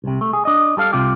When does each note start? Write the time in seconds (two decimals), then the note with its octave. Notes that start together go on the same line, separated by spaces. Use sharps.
0.04 C2 C3
0.21 A3
0.33 G#4
0.45 D4 D#5
0.77 G3 A4 F5
0.93 C2 C3 F4 G4